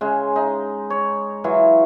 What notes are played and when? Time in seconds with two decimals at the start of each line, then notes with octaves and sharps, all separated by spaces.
0.01 C#3 G#3
0.36 D#4
0.90 C#5
1.44 E3 F#3 F4